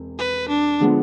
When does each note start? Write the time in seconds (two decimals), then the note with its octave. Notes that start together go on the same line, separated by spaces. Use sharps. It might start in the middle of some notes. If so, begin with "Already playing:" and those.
Already playing: E1 C3
0.18 B4
0.49 D4
0.80 D3 F3 G#3 B3